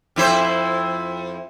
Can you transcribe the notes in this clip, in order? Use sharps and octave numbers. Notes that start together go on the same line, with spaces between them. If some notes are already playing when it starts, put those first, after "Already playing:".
F2 E4 C5